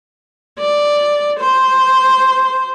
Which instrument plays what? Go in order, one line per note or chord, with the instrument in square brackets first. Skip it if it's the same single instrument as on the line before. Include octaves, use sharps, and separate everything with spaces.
[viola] D5
C5